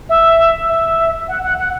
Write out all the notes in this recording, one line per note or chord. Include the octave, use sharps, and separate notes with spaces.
E5
E5
F#5
F#5
F#5